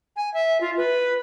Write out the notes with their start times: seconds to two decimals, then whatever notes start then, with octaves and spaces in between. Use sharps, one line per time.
0.16 G#5
0.34 E5
0.61 F4
0.77 B4